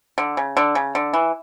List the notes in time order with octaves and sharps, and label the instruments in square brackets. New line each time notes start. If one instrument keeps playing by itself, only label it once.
[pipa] D3
C#3
D3
C#3
D3
E3